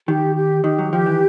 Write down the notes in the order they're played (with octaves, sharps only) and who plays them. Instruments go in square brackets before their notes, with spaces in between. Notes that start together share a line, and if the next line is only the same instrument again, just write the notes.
[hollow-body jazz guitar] D#3 [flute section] G4
[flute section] G4
[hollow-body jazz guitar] D#3 [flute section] G4
[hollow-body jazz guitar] F#3
[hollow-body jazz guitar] F3 [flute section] G4
[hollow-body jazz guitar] E3